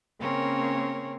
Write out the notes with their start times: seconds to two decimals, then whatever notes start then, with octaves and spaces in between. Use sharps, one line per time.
0.20 C#3 A#3 C4 C#4 A#4 C#5